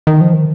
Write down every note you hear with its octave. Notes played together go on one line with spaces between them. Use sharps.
D#3
F3
D#3